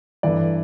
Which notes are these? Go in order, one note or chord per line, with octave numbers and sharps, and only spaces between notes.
G2 E3 A3 D5